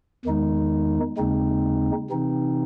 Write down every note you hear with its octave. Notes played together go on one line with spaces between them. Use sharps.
E2 D#3 G#3 D#4
D#2 C#3 G#3 C4 D#4
C3 E3 C4 D#4